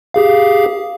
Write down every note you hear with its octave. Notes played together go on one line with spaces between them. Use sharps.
G4 G#4 F5